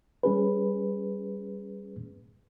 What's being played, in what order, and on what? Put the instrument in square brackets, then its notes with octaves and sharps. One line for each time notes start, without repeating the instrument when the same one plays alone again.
[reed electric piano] G3 C#4 G#4 B4